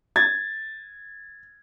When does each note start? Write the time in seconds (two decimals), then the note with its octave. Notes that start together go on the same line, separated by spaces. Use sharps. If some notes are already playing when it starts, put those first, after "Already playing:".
0.16 G#6 A6